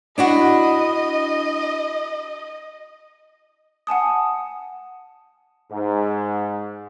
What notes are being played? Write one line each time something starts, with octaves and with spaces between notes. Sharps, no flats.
D4 E4 F#4 D#5
F#5 G#5 A5 D#6
G#2